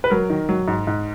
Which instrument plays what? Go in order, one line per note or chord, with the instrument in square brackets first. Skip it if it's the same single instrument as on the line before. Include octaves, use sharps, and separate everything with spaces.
[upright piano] B4
F#3 A#4
D#3
F#3
G#2
G#2